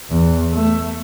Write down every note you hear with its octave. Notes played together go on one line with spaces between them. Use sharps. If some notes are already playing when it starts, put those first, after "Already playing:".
E2
A3